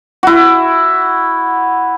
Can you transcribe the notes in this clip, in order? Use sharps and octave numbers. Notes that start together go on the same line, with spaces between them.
E4 F#4